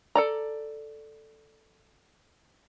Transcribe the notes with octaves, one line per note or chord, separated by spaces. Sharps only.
A4 D5 A#5